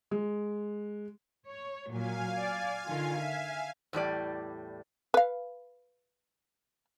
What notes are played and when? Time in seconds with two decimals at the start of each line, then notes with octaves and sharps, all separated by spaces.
0.11 G#3
1.48 C#5
1.91 A#2 F#3 F5 G#5
2.38 D5
2.85 D3 D#3 F4
3.20 E5
3.93 E2 A2 G3 D5
5.14 B4 F5